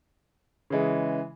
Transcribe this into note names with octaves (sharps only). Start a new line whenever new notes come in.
C#3 E3 G#3